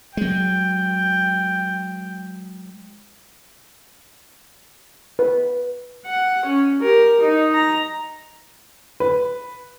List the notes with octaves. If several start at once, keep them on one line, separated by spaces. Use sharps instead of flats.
F#3 G#3 G5
B4
F#5
C#4
G4 A#4
D#4
A#5
B4